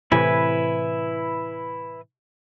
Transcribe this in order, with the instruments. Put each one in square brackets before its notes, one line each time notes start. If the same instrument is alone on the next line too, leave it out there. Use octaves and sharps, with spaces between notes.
[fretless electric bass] A2 C3 E3 [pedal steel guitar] E4 B4 G#5